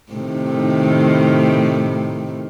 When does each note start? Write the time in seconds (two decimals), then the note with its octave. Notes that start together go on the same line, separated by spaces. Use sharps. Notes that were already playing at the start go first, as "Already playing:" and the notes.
0.12 A2 C3 D#3